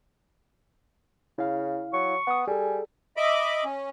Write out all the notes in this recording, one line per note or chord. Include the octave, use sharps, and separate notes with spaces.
C#3 E4 F5
F#3 C#6
B3 F#5 D#6
G3 G#4 A4 G#5
D#5 E5 B5 D6
C#4